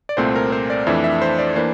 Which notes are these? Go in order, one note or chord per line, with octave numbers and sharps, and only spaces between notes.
D5
C2 A#2 A3 C4 C5
A#4
C5
D5
F2 E3 A3 D4 E5
E5
C5
D5
E3 A#3 D4 C5